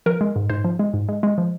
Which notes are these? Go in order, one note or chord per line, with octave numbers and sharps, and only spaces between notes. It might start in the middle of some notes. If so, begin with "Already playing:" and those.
F3 A#4
G#3
G#2
G#2 C5
F3
G#3
G#2
G#3
G#3
F3